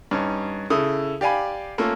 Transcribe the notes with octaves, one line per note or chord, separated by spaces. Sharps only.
G2 C#4 D#4
C#3 E4 A4 D#6
G4 D5 F5 G#5 B5
A3 A#3 C#4 F4 A4